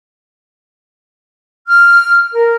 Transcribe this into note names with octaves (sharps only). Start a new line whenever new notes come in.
F6
A#4